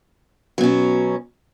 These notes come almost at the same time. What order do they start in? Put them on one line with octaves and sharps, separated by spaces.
F#3 B2 C#4